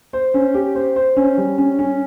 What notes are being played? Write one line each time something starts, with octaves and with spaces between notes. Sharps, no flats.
C5
C#4
G4
C5
C5
C#4
G3
C#4
C#4